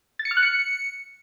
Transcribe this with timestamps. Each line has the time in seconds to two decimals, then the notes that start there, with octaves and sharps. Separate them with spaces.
0.19 A6
0.25 C#7
0.31 F6
0.37 F#6
0.43 C#7